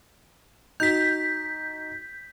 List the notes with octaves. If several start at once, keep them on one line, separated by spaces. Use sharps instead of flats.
D#4 F#4 G6 B6